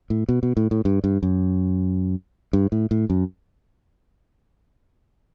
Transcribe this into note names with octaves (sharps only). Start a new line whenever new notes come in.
A2
B2
B2
A2
A2
G2
G2
F#2
G2
A2
A2
F#2